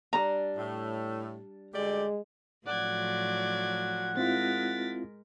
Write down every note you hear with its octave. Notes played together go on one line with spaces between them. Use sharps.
G3 D4 A#5
A2
D2 G#3 G4 D5
A2 F3 F#3 D5 F#5 G#6
G#3 C4 E4 F4 A#4 A6 B6